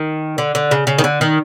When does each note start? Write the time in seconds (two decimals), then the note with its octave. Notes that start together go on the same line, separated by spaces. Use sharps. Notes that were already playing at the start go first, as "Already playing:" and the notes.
Already playing: D#3
0.38 D3
0.55 D3
0.71 C#3
0.87 C#3
0.99 D#3
1.04 D3
1.21 D#3